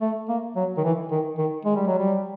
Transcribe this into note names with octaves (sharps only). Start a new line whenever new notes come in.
A3
A#3
F#3
D#3
E3
D#3
D#3
G#3
G3
F#3
G3